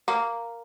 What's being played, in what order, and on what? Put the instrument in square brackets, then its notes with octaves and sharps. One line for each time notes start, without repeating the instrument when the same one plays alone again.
[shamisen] A#3